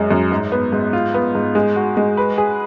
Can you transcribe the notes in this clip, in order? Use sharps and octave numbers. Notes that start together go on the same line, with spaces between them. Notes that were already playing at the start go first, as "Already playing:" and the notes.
Already playing: F#2 G#3
F#2
G#2
B3
G#2
F4
B3
G#2
G#3
F#4
G#3
B4
G#4